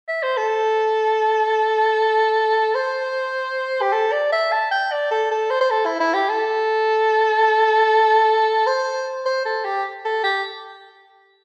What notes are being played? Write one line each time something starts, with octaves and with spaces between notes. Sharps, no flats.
E5
C5
A4
C5
G4
A4
D5
E5
A5
G5
D5
A4
A4
C5
C5
A4
E4
E4
G4
A4
C5
C5
A4
G4
A4
G4